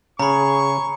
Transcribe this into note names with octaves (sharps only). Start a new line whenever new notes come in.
C#3 C#4 G#4 A#5 B5 C#6